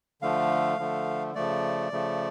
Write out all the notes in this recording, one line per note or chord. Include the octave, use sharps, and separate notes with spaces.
D3 F3 A3 F5
D3 F3 A3
C#3 F3 A3 D5
C#3 F3 A3